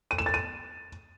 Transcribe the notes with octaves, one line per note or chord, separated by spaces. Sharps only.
D#7
E7
A6
D#7